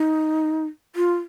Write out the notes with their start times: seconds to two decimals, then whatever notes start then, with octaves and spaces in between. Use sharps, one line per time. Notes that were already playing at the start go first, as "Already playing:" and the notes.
Already playing: D#4
0.96 F4